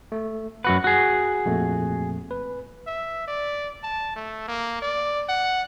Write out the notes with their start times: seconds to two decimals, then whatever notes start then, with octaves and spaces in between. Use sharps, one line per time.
0.12 A3
0.64 F#2 F#4 B4 F#5 F#6
0.84 F#4 G#4
1.46 F2 A#2 A3
2.31 B4
2.87 E5
3.28 D5
3.83 A5
4.16 A3
4.48 A#3
4.82 D5
5.29 F#5